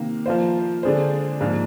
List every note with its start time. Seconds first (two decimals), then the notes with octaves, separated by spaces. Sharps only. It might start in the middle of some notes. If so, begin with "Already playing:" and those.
Already playing: C3 D#3 A#3
0.26 F3 A#3 F4 C5
0.83 D3 G#3 D4 G#4 C5
1.41 G#2 F3 A#3 D4